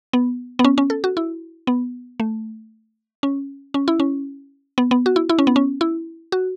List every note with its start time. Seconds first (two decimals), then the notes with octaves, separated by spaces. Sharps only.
0.13 B3
0.59 B3
0.64 C#4
0.78 C#4
0.90 A4
1.04 F#4
1.17 E4
1.67 B3
2.20 A3
3.23 C#4
3.74 C#4
3.88 E4
4.00 C#4
4.78 B3
4.91 B3
5.06 F#4
5.16 E4
5.29 E4
5.39 C#4
5.47 B3
5.56 C#4
5.81 E4
6.32 F#4